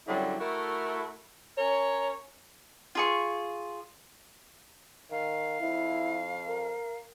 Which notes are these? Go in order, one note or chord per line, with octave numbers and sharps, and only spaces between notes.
F#2 D3 F#3 G3 E4
A3 E4 F#4 A4 A#4
C#4 A#4 C#5
F4 G#4 C#6
D#3 F5
F2 E4
A#4